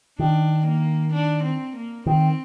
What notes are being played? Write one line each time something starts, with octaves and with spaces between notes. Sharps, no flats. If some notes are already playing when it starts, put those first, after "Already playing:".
D#3 D4
A#3
D4
C4
A#3
D#3 C4